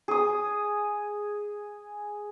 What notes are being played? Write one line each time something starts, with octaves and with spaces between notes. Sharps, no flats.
G#4 D#6